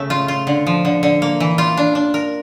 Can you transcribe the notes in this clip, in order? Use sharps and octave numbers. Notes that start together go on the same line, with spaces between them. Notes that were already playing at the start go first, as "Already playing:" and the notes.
Already playing: C#3 A3
F4
F4
D3
F3
D3
D3
A#3
E3
F4
D4
D4
A#4